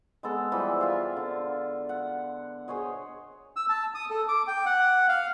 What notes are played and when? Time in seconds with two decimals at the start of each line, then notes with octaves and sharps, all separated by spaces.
0.23 G#3 B3 A4 F#5
0.52 E3 F3 G3
0.81 F4 E5 F5
1.17 D3
1.89 F#5
2.68 G#4 C5 C#5 D#5
3.56 E6
3.69 A5
3.95 D#6
4.10 A4
4.28 D6
4.47 G5
4.66 F#5
5.09 F5